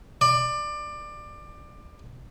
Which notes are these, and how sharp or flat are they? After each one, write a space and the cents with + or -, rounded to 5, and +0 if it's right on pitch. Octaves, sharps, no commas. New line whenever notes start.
D5 +20